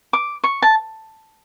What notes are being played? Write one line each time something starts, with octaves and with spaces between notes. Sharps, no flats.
D6
C#6
A5